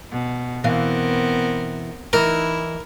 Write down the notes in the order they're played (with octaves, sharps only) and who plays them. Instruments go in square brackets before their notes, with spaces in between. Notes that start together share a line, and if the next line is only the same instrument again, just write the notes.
[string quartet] B2
[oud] B2 E3 F5 [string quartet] B3 C4 A#4
[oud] E3 D#4 [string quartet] E4 [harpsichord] A#4